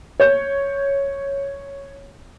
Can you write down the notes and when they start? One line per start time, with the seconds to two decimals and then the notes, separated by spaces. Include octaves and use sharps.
0.20 C#5 G6